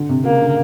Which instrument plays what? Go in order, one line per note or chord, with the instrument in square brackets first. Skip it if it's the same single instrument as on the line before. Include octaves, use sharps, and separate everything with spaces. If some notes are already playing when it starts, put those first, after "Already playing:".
Already playing: [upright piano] D3
C3
[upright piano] C#3 [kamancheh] A#3
[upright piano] D3